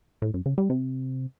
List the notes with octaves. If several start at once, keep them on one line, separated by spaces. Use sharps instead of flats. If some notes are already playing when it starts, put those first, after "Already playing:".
A2
F#2
C#3
G3
C3